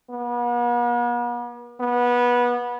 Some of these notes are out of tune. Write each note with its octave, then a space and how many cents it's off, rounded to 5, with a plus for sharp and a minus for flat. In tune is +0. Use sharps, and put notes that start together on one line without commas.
B3 -45
B3 -20